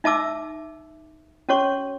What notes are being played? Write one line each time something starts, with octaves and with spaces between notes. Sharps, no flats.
D#4 E5 A5 D6 E6
C#4 F#4 C#5 C#6